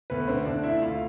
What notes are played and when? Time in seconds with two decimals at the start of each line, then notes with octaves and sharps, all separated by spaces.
0.10 D2 B3 B4
0.28 D3 C4 C5
0.45 D2 D4 D5
0.63 D2 E4 E5
0.82 D2 F4 F5